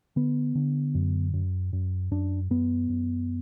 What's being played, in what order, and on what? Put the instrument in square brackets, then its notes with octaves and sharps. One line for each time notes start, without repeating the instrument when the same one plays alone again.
[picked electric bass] D3 B3
D3
F#2
F#2
F#2
F#2 D4
F#2 B3
F#2